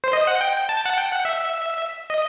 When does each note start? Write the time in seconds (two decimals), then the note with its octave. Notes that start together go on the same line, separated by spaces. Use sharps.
0.04 C5
0.13 D#5
0.27 F#5
0.41 G5
0.69 A5
0.85 F#5
0.98 G5
1.12 F#5
1.25 E5
2.10 D#5